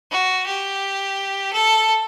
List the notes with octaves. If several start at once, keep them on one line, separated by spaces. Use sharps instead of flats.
F#4
G4
A4